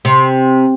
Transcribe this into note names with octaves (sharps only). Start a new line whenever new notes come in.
C3